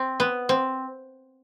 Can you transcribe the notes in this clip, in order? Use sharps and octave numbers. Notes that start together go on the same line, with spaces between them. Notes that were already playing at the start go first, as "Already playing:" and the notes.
Already playing: C4
B3
C4